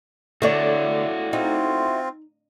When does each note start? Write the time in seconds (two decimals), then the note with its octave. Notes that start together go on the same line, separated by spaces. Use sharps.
0.42 D3 A3 D4 E4 F#4 C#5 D5
1.33 C4 D#4 F4